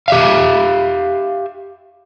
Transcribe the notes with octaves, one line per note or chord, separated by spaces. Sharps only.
G4 E5 F5